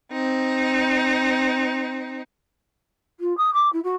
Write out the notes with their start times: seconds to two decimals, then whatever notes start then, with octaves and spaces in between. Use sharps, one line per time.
0.11 C4 D#4
3.20 F4
3.37 D#6
3.53 D6
3.72 E4
3.83 F#4